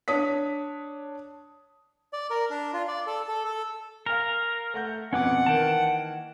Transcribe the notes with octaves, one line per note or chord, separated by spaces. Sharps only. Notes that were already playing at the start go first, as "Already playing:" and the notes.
D4 C#5 D#6 B6
D5
A#4
D4
F4
D5
A4
A4
A4
A#4 F5 G#5 F6
A3 F#5 G6
F2 B2 C#4 B4 F#5 D6
D#3 E3 A#3 G5 A5